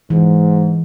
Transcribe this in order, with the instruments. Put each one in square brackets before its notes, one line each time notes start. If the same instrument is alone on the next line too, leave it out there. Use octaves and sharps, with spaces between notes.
[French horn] G#2 [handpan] E3